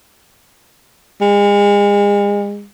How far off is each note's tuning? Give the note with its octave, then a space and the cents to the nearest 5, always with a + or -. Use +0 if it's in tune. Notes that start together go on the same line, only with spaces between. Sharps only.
G#3 -35